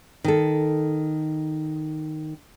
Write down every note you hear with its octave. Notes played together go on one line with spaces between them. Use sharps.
D#3 A4